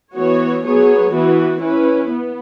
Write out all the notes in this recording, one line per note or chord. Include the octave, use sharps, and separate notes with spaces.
E3 B3 F#4 C#5
F#3 B3 G#4 C#5
E3 B3 F#4 B4
C#4 E4 B4
B3